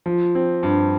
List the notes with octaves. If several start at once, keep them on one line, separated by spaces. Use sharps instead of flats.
F3
C4
G2